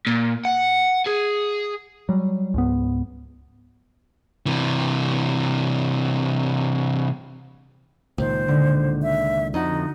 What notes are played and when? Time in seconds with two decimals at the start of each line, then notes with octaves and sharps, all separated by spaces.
0.07 A#2
0.45 F#5
1.07 G#4
2.09 F#3 G3
2.54 C#2 G#2 B3
4.46 C3 E3
8.18 C#2 A#2 D#3 C5
8.48 D3
9.03 E5
9.54 F2 D#4 F#4 D#5